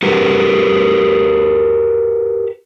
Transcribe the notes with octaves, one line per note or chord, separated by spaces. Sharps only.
F#4 G4 A#4 B4